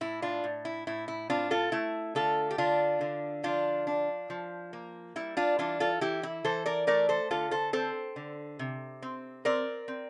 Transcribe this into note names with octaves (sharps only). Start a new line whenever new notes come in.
A2 E4
D4 F4
A2
E4
A2 E4
E4
C4 D4 F4
F4 A4
A3 E4
D3 F4 A4
G4
D3 D4 F4
D3
F3 D4 F4
D4
F3
A#3
G3 E4
D4 F4
E3 D4 F4
F4 A4
E3 E4 G4
E4
E3 A4 C5
A#4 D5
A3 A#4 D5
A4 C5
D3 F4 A4
A4 C5
C4 A4 C5
D3
C3
C4
C4 A#4 D5
C4